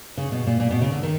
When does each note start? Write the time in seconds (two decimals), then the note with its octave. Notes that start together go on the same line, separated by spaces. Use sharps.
0.17 C#3
0.32 B2
0.47 A#2
0.60 A#2
0.71 B2
0.81 C#3
0.92 D3
1.03 D#3